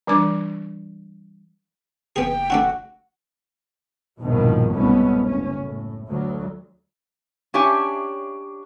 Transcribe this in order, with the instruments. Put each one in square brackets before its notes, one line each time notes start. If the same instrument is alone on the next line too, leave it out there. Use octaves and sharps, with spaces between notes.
[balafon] E3 G3 D4 D6
[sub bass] F#1 [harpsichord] B3 G#4 [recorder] G5
[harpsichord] A3 D4 E4 [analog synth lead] F#4
[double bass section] A#1 E2 G2 B2 D#3 F3
C2 G#2 B2 A3 B3 C#4
F#1 C#4
A2
D2 F#3
[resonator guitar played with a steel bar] C#4 D4 G4 C#5 E5 G#5